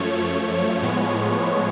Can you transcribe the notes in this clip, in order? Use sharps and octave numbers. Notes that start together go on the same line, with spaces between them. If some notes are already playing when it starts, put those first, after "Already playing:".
Already playing: F#2 F3 A3 C#5
A2 F3 G#3 B3